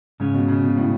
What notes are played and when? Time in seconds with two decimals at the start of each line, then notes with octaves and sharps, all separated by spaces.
0.20 G#2 C#3 G#3 C#4
0.34 B2
0.48 C#3
0.64 B2
0.77 A2